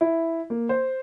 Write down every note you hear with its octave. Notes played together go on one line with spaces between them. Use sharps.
E4
A#3
C5